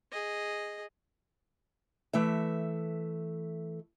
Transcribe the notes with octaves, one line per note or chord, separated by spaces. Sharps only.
G#4 D#5
E3 A3 E5